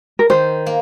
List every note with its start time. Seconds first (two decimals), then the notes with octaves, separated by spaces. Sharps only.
0.19 A#4
0.30 D#3 C5
0.67 A#3